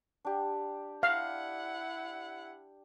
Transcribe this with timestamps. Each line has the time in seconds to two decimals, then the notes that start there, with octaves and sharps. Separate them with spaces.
0.25 D4 G4
1.03 E4 F5 F#5